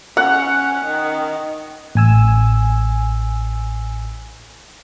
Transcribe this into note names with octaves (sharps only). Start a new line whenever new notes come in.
C#4 F#5
D#3
A1 G#5 E6